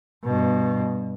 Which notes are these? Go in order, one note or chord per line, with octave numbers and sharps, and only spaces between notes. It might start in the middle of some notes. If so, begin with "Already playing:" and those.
G2 B2